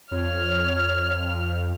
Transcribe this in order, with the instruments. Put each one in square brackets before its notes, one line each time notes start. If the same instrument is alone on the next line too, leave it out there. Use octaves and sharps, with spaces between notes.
[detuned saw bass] F2 [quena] C#5 [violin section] F6